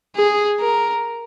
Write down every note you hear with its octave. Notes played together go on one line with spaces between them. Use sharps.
G#4
A#4